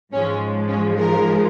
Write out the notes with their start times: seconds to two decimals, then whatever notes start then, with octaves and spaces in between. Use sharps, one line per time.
0.12 G#2 F3 G#3 C#4
0.69 C#4
0.97 A#4